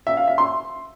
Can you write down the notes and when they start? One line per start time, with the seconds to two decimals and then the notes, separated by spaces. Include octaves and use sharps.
0.07 E5
0.17 F5
0.27 E5
0.38 C6